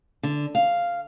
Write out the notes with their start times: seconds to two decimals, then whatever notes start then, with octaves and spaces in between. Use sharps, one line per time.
0.23 D3
0.55 F5